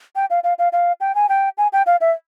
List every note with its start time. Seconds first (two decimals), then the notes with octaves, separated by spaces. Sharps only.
0.16 G5
0.30 F5
0.44 F5
0.59 F5
0.73 F5
1.01 G5
1.15 G#5
1.29 G5
1.58 G#5
1.73 G5
1.86 F5
2.01 E5